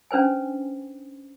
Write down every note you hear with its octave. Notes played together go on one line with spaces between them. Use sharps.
C#4 D4 B4 C5 G#5